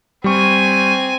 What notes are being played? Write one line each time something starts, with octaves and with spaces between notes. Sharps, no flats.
G3 C4 G#5 C#6